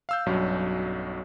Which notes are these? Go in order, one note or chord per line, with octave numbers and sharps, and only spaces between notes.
F5 E6 G6
B1 G2 F#3 C#4